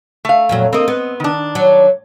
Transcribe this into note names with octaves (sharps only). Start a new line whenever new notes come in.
A3 F5
F2 A#2 F#3
A#3 C4 A#4 D#5
B3
D#3 D4
F#3